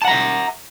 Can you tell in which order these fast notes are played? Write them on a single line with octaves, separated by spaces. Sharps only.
A5 F#5 A#5 E5